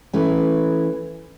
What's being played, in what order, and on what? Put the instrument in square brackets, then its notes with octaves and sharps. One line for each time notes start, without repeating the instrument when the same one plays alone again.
[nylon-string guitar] E3 A3 C#4